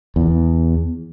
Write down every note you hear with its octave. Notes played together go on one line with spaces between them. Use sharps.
E2